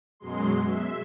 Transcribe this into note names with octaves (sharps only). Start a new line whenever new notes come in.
F#2 B2 F#3 G#3 C6
E5